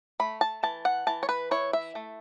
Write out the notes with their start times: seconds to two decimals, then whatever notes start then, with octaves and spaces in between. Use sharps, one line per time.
0.20 A3 B5
0.41 A5
0.63 E3 A5
0.85 F#5
1.07 E3 A5
1.23 C#5
1.29 B4
1.51 E4 C#5
1.73 E5
1.95 A3